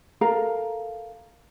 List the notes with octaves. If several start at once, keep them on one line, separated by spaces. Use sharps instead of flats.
A4 A#4 F5 A#5